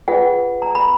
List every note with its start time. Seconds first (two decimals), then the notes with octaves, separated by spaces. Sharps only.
0.08 F4 G#4 B4 F#5
0.62 A#5
0.75 B5